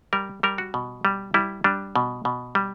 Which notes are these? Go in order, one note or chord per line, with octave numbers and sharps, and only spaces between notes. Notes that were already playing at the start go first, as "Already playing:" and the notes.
G3 A#4
G3 A#4
F#4
B2
G3
G3 E4
G3 D4
B2
B2
G3